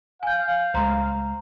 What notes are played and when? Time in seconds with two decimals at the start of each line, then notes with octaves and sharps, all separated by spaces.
0.23 F5 G#5 G6
0.74 C#2 G#3 C5 A#5 C6